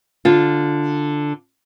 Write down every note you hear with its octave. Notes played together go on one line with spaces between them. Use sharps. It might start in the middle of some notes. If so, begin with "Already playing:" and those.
D3 F4